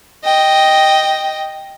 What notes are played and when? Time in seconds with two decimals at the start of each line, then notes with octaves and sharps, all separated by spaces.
0.24 D#5 G5